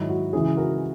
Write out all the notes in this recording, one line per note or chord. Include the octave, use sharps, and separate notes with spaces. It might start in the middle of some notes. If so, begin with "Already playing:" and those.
Already playing: G#2 D#3 F#3 E4 G#4
F#4
C#2 C#3 E3 E4 G#4
F#4 A#4